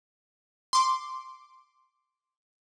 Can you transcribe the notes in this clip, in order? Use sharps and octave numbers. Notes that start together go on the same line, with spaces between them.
C6 D6